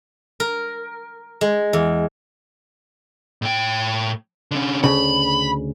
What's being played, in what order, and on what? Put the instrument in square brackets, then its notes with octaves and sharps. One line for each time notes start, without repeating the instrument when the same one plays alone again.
[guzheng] A#4
G#3
E2
[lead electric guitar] A2 G5
D3 C#4
[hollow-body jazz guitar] D2 C#3 [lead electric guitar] B5